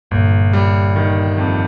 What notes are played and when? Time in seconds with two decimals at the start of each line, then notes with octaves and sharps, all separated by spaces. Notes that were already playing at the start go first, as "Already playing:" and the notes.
0.11 G1 G2 A#2
0.53 G3
0.96 D#3
1.38 F2